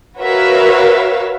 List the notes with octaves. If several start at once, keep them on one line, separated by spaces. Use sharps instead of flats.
F#4 A#4 B4 C#5 E5 F5